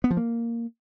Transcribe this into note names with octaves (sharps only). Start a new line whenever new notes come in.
B3
F3
A#3